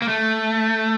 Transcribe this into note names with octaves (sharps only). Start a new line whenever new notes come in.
A#3
A3